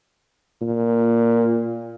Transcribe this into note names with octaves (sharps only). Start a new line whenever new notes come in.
A#2